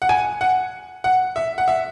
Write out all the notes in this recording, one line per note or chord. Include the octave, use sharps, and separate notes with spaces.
F#5
G#5
F#5
F#5
E5
F#5
E5